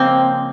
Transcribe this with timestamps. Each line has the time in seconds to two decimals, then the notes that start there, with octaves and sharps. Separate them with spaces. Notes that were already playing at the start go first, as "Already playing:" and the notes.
Already playing: C#3 F3 G#3 A#3 C4